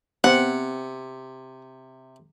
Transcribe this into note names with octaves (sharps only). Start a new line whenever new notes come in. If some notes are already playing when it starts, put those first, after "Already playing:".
C3 B3 C4 F#5